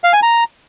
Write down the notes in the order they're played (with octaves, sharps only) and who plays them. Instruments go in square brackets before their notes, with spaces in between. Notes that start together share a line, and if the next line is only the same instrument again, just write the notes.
[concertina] F5
G#5
A#5